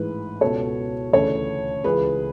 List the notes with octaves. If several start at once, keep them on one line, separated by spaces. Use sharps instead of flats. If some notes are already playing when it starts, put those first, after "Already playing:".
Already playing: A1 G#2 E3 B4
C#2 B2 A4 C#5
D2 C#3 E3 A4 C#5
C#2 C#3 E3 G#4 B4